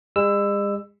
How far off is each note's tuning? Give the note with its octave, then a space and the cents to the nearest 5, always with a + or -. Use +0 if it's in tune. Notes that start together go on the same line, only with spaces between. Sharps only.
G#3 -45 E6 +10